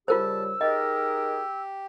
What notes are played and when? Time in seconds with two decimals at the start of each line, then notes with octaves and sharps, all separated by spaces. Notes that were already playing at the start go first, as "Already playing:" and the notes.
0.08 C#3 G3 F4 G4 A#4 C5 A5 E6
0.61 D#4 G4 G#4 A#4 D#5